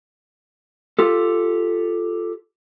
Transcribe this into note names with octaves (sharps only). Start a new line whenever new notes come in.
F4 G4 A4